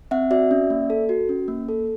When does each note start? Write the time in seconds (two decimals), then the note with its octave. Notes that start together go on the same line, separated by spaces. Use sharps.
0.11 C4 E5 F#5
0.31 F#4 D5 E5
0.51 C#4
0.70 A#3
0.90 A4
1.09 F#4
1.29 C#4
1.48 A#3
1.69 A4